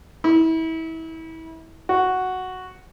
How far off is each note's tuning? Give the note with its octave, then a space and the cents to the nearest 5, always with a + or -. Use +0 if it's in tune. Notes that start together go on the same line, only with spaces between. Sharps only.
E4 -30
F#4 +0